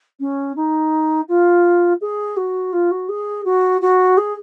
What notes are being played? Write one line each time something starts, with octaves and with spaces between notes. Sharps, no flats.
C#4
D#4
F4
G#4
F#4
F4
F#4
G#4
F#4
F#4
G#4